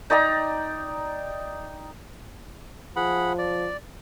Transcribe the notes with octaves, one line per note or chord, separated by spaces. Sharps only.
D#4 D5 G5 A#5
F3 G#4 F#5 B5
D5